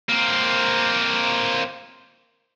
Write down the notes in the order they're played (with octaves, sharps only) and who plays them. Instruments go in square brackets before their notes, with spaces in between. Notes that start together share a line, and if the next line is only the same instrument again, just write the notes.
[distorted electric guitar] A#3 C4